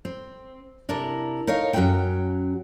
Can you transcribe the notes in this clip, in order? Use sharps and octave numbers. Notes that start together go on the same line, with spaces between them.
C4
C3 D4 E4 A#4 A#5
D#4 A#4 C#5 D#5 F5
F#2 F#3 G#3 C#4 D#4 G5